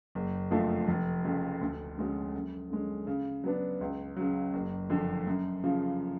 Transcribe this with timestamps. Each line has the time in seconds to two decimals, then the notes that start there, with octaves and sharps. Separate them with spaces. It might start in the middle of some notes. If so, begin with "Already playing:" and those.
0.15 F#1
0.51 F2 D3 F3 A3
0.88 F1
1.24 F2 C#3
1.61 D2
1.98 D3 G#3 C#4 F#4
2.34 F#2
2.70 D3 G#3 C#4
3.07 C#3
3.44 F#3 B3 D4
3.81 C#2
4.16 C#3 F#3
4.53 F#1
4.90 F2 D3
5.27 F#2
5.64 C#3 F3